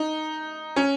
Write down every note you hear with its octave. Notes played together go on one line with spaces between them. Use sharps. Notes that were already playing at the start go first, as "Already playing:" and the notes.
Already playing: D#4
C#4